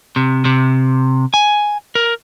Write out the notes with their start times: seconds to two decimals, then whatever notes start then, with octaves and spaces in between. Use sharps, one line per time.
0.16 C3
0.45 C3
1.34 G#5
1.95 A#4